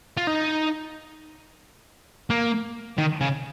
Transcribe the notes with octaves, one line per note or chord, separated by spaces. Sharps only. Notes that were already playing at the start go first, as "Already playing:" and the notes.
F4
D#4
A#3
D#3
C#3